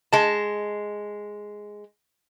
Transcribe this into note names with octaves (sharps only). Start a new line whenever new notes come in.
G#3 A5